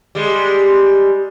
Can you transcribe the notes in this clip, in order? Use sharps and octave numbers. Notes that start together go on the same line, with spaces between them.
G3 G#3